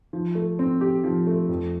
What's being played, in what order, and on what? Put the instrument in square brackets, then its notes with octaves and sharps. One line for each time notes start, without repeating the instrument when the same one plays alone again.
[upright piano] F3
A3
C4
G4
F3
A3
F2